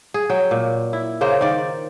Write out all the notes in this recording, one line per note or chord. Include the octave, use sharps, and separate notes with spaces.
G#4
F#3 G5
A#2
E4
C#3 A#3 C5
D#3 D5